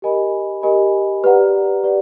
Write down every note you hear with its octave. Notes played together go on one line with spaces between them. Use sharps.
G4 A#4 D#5 G#5 B5
G4 A#4 D#5 G#5 B5
G4 B4 D5 F#5 A#5
G4 B4 D5 F#5